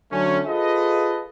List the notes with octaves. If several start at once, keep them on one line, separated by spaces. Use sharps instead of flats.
D3 F#3 A3 C#4
F4 G#4 A4 B4 D#5